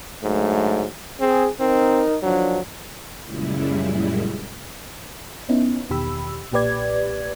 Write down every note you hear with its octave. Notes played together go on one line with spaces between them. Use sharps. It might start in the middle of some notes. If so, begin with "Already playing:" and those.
G#2 D3 F#3 A3
C4 G#4
C4 D#4 A#4
D#3 F3 F#3 D4
F#2 A#2 C#3 G3 G#3 E4
B3 C#4 D#4 E4
E2 B2 D#3 G4 B5 E6
B1 A#2 G4 B4 D5 G#6